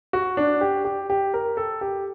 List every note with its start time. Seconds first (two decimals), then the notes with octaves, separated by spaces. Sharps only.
0.13 F#4
0.37 D4
0.61 G4
0.85 G4
1.10 G4
1.34 A#4
1.57 A4
1.81 G4